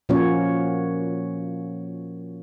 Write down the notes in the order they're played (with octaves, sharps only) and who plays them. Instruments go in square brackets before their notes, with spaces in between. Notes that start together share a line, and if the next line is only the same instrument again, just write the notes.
[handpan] A#2 F3 A#3 C#4 F#4 C#5